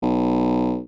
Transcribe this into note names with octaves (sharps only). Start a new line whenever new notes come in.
B1